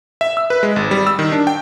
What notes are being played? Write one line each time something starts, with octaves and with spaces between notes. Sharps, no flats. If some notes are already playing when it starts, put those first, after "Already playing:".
E5
E6
B4
G#3
G#1
G3
E6
D#3
D4
G5